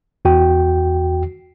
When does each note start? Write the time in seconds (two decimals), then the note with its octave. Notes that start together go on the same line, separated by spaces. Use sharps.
0.25 E2 F#4 G5